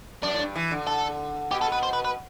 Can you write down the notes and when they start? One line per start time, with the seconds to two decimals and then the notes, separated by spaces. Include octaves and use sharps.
0.23 F#2 D4
0.34 A2
0.39 G2
0.56 E3
0.71 D3
0.87 A4
1.51 B2 G4
1.61 A4
1.72 B4
1.83 C5
1.93 B4
2.05 B4